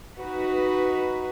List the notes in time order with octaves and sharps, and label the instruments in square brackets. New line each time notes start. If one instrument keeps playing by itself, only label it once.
[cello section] D#4 F#4 B4